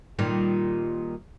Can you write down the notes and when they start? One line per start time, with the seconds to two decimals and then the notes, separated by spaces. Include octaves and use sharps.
0.19 A#2 D#3 G3